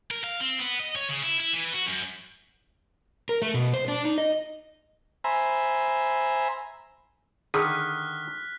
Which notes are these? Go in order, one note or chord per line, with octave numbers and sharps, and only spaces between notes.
A#4
F5
C4
B3
D#5
C#5
C#3
E4
E4
E3
F#4
F#2
A#4
A3
B2
C5
D4
D#4
D#5
C5 E5 G#5 A#5 B5
D3 D#3 G#4 F6 F#6 B6